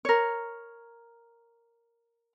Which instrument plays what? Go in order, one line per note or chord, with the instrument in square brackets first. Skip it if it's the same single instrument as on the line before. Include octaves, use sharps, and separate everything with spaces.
[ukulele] A#4 C#5